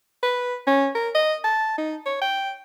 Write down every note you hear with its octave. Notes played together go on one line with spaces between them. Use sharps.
B4
C#4
A#4
D#5
A5
D#4
C#5
G5